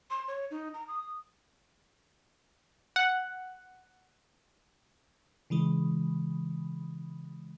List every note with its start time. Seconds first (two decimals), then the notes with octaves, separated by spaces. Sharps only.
0.10 C6
0.28 C#5
0.51 D#4
0.74 A#5
0.88 D#6
2.96 F#5
5.50 C#3 E3 G#3